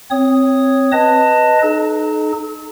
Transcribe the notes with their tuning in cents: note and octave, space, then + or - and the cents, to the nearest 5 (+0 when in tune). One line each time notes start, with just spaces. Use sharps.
C4 +5 C#5 +0 D#6 +0
B4 +0 D#5 +0 A5 +20
D#4 -25 A4 -40